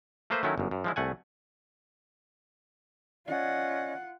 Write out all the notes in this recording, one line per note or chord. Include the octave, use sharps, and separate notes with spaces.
A3 A#3 B4 C5 E5
D#3 F#3 A3 C#4 E4
G1 F#2
F#2
F3 G#3 E4
C2 A3 F#5 G#5
C#4 F4 D5 D#5 F#5